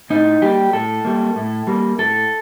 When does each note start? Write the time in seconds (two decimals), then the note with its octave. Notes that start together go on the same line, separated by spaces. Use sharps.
0.10 A2 D#4
0.42 G3 A#3 G4
0.73 A2 A4
1.05 G3 A#3
1.36 A2
1.67 G3 A#3
1.99 A2 A4